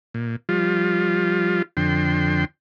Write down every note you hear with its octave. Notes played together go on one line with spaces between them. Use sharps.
A#2
F3 G3 F4
F2 D3 G5 C6